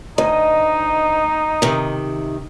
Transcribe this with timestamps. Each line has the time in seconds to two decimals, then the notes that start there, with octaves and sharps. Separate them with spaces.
0.18 D2 D#4 D#5
1.62 C3 D#3